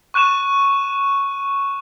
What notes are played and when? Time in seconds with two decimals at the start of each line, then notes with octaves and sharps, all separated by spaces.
0.14 C#6 F#6 D#7 E7